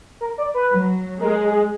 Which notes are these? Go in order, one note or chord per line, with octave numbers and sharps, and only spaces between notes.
A#4
D5
B4
F#3
G#3 A#4
G#4